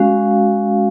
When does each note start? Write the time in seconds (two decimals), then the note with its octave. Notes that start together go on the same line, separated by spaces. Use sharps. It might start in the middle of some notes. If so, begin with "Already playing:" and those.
Already playing: G#3 C#4 F#4 F5